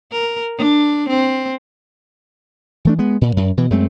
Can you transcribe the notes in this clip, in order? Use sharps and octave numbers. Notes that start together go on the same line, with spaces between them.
A#4
D4
C4
E3 A3 D4
G#3 B3
A#2
F#2
B2 E3
F#2 G#3 A3 C4